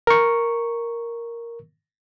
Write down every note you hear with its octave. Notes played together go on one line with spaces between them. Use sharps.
A#4 C#6